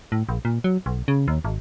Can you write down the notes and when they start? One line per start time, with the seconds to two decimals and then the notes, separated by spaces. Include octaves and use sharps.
0.12 A2
0.29 A#1
0.45 A#2
0.64 F#3
0.86 B1
1.08 C#3
1.28 D#2
1.45 G#1